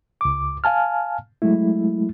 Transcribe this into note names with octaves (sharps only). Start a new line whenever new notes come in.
C#2 D6
F5 G#5 A5 F6
F#3 G#3 A3 E4